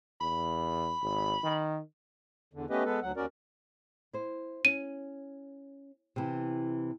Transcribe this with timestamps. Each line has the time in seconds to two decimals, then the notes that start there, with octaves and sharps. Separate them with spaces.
0.21 E2 B5
1.02 G#1
1.43 D#3
2.53 E2 D3
2.70 A3 B3 C#4 G4 B4 D#5
2.85 G#3 B3 A4 B4
3.02 D2 F#3 F#5
3.16 D#2 C#4 F#4 A#4 D5
4.13 E4 C5
4.65 C#4 D#7
6.16 C3 E3